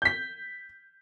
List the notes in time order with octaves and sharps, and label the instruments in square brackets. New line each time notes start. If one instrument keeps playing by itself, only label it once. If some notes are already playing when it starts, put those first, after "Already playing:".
[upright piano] G6 B6